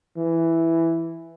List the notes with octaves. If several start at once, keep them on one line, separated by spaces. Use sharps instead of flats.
E3